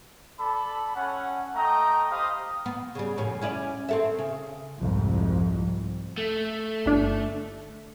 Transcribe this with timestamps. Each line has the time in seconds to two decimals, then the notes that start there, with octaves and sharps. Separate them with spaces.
0.39 A4 D5 A5 B5
0.95 C#4 F#5
1.55 A3 D#5 G5 A#5
2.10 G4 C5 D#5 F5 B5 D#6
2.66 B3
2.95 C#3 G3
3.17 F2 A2 C#4
3.41 C#4 E4 D5
3.89 C4 A4 E5
4.19 C#3
4.78 C2 F2 G#2
6.18 A3
6.86 G1 D4